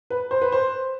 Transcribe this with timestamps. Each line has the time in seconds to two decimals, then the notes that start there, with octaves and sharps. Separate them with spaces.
0.10 B4
0.31 C5
0.42 B4
0.52 C5